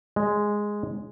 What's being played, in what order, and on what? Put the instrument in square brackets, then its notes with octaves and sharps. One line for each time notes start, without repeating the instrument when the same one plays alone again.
[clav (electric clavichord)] G#3